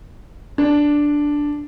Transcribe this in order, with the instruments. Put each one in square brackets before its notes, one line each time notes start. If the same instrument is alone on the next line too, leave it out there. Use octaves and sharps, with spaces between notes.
[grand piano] D4